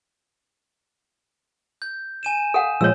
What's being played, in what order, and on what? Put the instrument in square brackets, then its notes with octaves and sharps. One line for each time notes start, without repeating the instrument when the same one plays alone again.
[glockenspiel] G6
G#5 D#7 E7
[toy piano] A4 F5 F#5
[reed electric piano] A#2 F3 G#3 [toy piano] C#5 E6